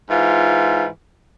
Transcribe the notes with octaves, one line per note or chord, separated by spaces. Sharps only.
G#2 E3 F4